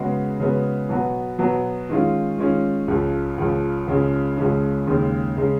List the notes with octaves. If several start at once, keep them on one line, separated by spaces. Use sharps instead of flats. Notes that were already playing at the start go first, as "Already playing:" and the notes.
Already playing: C#3 G#3 B3 F#4
C#3 G#3 B3 F#4
B2 F#3 B3 F#4
B2 F#3 B3 F#4
D#3 G#3 C#4 F4
D#3 G#3 C#4 F4
C#2 C#3 F3
C#2 C#3 F3
C#2 C#3 F3 G#3 C#4
C#2 C#3 F3 G#3 C#4
D#2 C#3 G#3
C#3 G#3